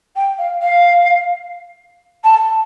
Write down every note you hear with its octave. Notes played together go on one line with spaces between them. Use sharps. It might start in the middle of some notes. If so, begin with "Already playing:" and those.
G5
F5
F5
A5